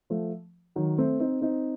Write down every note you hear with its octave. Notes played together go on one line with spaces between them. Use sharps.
F3 A3
D#3 F#3
A3 C4
C4 D#4
C4 D#4